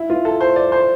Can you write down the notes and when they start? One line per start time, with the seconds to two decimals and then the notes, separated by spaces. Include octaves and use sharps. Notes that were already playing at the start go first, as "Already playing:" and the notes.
Already playing: E4
0.10 F4
0.25 A4
0.40 C5
0.56 D5
0.72 C5